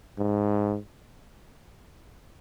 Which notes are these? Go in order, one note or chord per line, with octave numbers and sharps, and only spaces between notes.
G#2